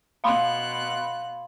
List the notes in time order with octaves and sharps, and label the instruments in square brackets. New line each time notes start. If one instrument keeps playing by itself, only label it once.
[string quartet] B2 F#6 [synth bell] F5 B5 C6